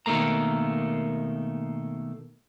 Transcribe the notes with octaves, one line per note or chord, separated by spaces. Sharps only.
B2 D#3 G3 A3 A#3 A#5